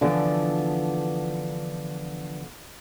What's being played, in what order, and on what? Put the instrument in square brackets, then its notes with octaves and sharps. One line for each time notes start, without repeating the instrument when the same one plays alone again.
[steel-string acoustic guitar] D3 E3 F3 B3